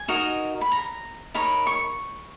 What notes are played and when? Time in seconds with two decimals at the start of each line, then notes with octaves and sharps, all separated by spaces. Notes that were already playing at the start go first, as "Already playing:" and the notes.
Already playing: G#5
0.08 D#4 F#4 A#4 D#5
0.61 B5
0.72 A#5
1.34 D#4 A#4 C#5 B5
1.67 C#6